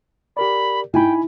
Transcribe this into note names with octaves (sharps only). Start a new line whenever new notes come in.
G4 A#4 D5 B5
D#4 E4 G5 G#5 B5